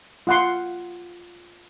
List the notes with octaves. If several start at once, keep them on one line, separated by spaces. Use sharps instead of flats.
F4 F#5 C6